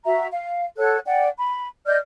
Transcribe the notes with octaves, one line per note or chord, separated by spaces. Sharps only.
F#4 E5 A#5
F5
A4 C#5 F#5 F#6
D5 F#5 G5
B5
D5 D#5 F6 G6